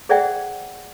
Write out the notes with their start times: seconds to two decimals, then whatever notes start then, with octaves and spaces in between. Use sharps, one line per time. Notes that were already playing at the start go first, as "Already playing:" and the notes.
0.09 G#4 C5 D5 E5 F#5 G5